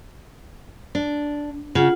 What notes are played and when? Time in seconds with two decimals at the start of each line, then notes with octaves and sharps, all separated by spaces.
0.95 D4
1.75 C#3 F4 F#5